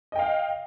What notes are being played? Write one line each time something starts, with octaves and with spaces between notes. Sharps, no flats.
D#5 F5 G5